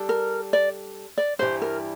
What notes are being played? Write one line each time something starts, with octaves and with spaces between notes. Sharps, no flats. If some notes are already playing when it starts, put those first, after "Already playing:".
Already playing: G3 D4 A4
A#4
D5
D5
G2 E3 G3 C5
A#4